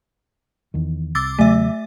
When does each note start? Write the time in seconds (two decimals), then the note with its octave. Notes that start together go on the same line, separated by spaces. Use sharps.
0.74 E2 D#3
1.15 C2 D6 E6 A6
1.39 E2 C#3 F#3 A3 E5